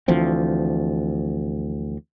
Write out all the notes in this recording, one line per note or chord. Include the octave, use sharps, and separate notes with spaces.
D2 E3 F3 C4